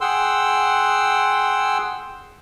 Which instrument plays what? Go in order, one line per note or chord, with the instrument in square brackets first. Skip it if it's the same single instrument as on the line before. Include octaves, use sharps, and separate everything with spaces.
[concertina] G#4 F#5 G5 C6 E6